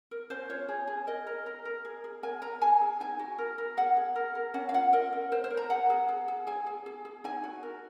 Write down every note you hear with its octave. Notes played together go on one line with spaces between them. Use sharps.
A#4
C#4 C5
F4 C#5
G#4
G#4
A#4 D#5
A#4
A#4
A#4
G#4
G#4
A#4 G#5
A#4 A#5
G#4 G#5
G#4
D#4 G#5
F#4
A#4
A#4
G#4 F#5
G#4
A#4
A#4
C#4 F#5
F5
F4 F#5
A#4 D#5
A#4
A#4 C5
C5
A#4
A#5
G#4 F#5
G#4
G#4
G#4
G#4 G#5
G#4
G#4
G#4
D#4 G#5
F#4
A#4